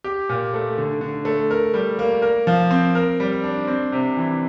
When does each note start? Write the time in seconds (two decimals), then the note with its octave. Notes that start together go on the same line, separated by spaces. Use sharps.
0.04 G4
0.29 A#2
0.54 A3
0.78 D3
1.01 D3
1.25 A3
1.50 A#4
1.74 G3
1.99 A#3
2.22 A#4
2.47 F3
2.71 C4
2.95 A#4
3.20 G3
3.44 D4
3.68 C4
3.92 C3
4.17 E3